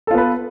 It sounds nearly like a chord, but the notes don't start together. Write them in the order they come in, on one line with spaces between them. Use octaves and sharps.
A4 F4 B3 B4